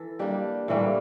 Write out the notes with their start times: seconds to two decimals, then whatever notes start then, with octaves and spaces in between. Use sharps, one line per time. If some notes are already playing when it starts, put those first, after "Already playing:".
Already playing: E3 A4
0.19 G3 A#3 D4 G4
0.68 A2 E3 G3 A#3